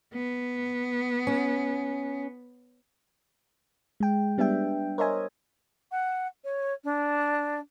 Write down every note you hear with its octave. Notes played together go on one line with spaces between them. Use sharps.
B3
C#4
G#3 G5
G3 B3 D4 E5 G5
A#4 C5 C#5 D#5 E5 G#5
F#5
C#5
D4